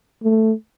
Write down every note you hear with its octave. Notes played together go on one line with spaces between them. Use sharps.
A3